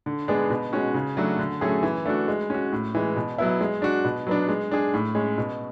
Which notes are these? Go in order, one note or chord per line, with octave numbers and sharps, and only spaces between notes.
D3
G#3 B3 D4 G#4
B2
G#3 C#4 F#4
C#3
F#3 A3 D4 F#4
D3
F#3 A3 C#4 G#4
E3
A3 D4 F#4
G#3
C#4 F#4
A2
E3 G#3
B2
F#3 B3 E4
G#3
D4 F#4
B2
F#3 B3 D4
G#3
D4 G#4
A2
G#3 C#4
B2